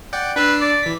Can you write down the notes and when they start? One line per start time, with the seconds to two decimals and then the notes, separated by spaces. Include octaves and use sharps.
0.13 D5 F#5 G5
0.36 D4 B4 E6 C7
0.61 D5
0.83 E3 B6